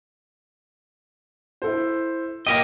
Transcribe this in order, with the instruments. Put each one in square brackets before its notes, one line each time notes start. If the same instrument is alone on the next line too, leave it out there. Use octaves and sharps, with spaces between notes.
[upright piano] E4 A4 C5
[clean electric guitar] A#3 G4 D#5 [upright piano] G5 A#6